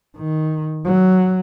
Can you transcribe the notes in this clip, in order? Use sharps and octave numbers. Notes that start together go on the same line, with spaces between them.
D#3
F#3